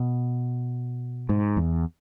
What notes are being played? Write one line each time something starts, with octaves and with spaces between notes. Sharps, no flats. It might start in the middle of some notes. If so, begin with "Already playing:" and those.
Already playing: B2
G#2
E2